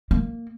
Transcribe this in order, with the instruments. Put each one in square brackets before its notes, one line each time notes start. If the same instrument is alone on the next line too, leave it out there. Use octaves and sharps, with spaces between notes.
[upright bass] A#3